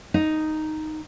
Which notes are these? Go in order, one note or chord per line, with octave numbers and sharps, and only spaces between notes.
D#4